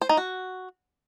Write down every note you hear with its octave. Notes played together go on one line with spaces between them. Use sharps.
C5
D#4
F#4